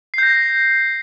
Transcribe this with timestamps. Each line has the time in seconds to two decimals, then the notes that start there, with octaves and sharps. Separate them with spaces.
0.14 C7
0.18 G6
0.23 A#6